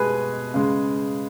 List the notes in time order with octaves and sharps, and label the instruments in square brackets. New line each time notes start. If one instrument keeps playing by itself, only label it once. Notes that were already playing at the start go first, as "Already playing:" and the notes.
Already playing: [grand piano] B2 G#3 G#4 B4
C#3 G#3